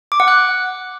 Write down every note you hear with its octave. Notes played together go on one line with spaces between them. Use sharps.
D6
F#5
F#6